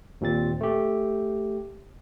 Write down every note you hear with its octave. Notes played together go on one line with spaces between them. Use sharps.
D#2 A#2 C4 A6
A3 G4